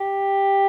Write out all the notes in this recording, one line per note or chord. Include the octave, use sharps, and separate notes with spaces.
G4